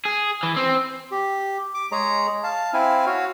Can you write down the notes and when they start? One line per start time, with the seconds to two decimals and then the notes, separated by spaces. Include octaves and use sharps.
0.05 G#4
0.43 E3
0.56 C4
1.11 G4
1.74 D6
1.92 G#3 G#4 C#5 A#5
2.44 F5 A5
2.74 C4 E4 F5 G#5
3.06 F#4 C#5 F5